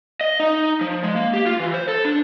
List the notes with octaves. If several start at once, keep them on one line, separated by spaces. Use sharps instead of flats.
D#5
D#4
F3
G#3
A#3
G4
F4
E3
C5
A4
D4